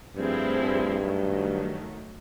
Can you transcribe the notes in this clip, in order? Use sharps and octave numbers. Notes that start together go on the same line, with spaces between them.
G2 F3 A3 C4 E4 G#4
G2
D#3 F#3 A3